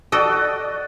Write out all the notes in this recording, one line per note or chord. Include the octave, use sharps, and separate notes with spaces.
F#4 A4 D5 D#5